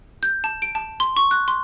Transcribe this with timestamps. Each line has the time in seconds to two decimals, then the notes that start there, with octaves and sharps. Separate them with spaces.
0.23 G6
0.44 A5
0.62 D7
0.75 A5
1.00 C6
1.17 C#6
1.31 F#6
1.48 C6